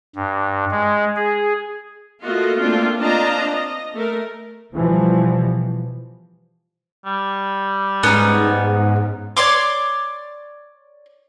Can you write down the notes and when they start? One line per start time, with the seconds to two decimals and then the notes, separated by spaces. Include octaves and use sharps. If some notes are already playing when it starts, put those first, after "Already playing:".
0.15 G2
0.71 G#3
1.16 G#4
2.23 A3 A#3 F4 F#4 D#5
2.59 A3 A#3 C4 D4 F4
2.99 C4 D4 F4 D#5 A5 A#5
3.50 D#5
3.94 A3 A#4
4.73 B2 E3 F3 G3
7.06 G3
8.03 G#2 B3 C#4 D#4
9.37 C#5 D5 C6 D6